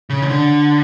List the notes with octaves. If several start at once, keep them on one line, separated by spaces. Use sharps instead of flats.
C#3
D#3
D3